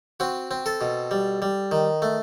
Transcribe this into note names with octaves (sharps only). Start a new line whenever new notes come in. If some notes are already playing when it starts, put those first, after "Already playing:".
C4 F#4
C4
A4
B2
G3
G3
D#3
A3